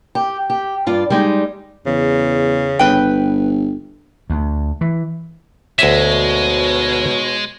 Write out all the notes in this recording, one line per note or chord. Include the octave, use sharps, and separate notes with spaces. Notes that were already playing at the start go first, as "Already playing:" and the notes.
G4
G4
G2 F4 D5
G3 G#3 D#4
E2 C#3
G1 B4 G5
D2
E3
D2 B2 G#3 D#4 C#5 E5